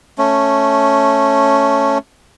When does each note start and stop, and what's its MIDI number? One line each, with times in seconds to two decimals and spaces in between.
0.18 1.98 57
0.18 1.98 61